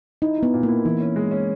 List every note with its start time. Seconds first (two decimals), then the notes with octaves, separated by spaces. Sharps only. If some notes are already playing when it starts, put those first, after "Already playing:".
0.22 D#4 E4
0.38 B3 E4
0.54 A#2
0.63 A#3
0.68 E4
0.85 E3 E4
1.00 C#4
1.16 G#3
1.31 C#4